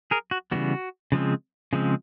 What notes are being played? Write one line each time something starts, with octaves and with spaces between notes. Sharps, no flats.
G#4 A#4
F#4
C#3 E3 G3 B3 F#4
C#3 F3 G#3 C4
C#3 F3 G#3 C4